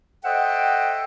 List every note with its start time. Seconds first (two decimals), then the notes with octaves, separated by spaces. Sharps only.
0.24 A4 C5 D#5 E5 F#5 G5